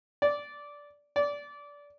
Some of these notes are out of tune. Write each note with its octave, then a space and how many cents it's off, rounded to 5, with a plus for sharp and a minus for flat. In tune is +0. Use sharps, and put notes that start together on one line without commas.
D5 -10
D5 -20